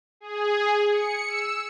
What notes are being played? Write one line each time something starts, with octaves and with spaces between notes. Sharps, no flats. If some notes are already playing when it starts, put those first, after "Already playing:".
G#4
C#7
E6